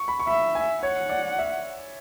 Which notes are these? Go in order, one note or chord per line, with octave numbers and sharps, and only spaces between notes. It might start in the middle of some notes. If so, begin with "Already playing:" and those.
Already playing: C#6
B5
C#6
E5 B5
G#5
C#5 F#5
D5
E5